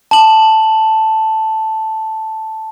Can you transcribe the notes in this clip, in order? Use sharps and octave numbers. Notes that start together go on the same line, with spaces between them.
A5 F#7